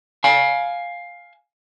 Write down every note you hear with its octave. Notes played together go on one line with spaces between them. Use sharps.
F5 G#5